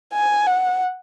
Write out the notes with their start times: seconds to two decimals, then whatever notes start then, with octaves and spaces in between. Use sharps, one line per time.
0.14 G#5
0.47 F#5